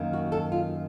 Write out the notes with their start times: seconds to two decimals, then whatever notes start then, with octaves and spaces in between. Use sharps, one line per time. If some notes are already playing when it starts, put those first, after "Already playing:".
Already playing: F#2 D#3 A#3
0.13 F#4
0.32 A4
0.52 F4